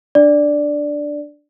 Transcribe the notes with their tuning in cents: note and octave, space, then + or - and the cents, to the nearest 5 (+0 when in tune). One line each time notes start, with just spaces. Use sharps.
D4 +0 D5 +0